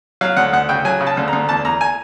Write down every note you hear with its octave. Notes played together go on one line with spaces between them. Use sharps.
F#3 F5
D2 F#5
D2 F#5
C#3 G5
F#3 G#5
C#3
A5
D2
A#5
D2
E2 A5
E2 A#5
G#5